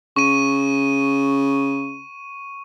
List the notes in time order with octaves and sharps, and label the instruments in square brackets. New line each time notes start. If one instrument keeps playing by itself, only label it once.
[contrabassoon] C#3 [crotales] C#6 D#7